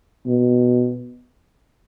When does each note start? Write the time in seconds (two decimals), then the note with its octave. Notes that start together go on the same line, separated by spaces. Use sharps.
0.27 B2